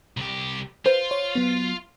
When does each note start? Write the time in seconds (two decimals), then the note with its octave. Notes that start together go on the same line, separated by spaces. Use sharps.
0.17 C2 G4
0.86 F4 B4 C5
1.11 C#5
1.35 F#3 B3